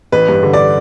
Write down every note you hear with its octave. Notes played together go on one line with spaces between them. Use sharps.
A1 B4
G2
D3
D5